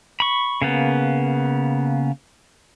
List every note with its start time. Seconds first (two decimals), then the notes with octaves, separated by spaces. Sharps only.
0.20 B5 C#6
0.62 C#3 A#3 B3